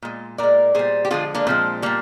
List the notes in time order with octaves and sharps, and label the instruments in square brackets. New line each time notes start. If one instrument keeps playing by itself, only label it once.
[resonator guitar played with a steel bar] A#2 G#3
A#2 G#3 A#4 D5
A#2 G3 G#4 C5
G4
D3 F3 G#3 F4 G#4
A#3 D4
A#2 F3 G#3 C4
A#2 G3 A#3